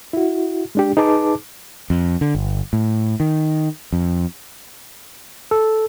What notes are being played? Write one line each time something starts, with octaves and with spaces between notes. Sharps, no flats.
E4 F#4
G#3 D4 G4
D#4 G#4 B4 A5 D6
F2
D3
G1
A2
D#3
F2
A4